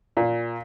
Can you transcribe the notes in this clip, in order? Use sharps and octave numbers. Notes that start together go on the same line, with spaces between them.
A#2